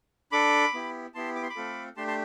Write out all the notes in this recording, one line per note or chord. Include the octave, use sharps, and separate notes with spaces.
D4 A4 B5 D6
B3 E4 G4
B3 E4 G4 A5 C6
D6
C6
B5 D6
A3 C4 F4 A4
A3 D4 G4 A5 C6
A5 C6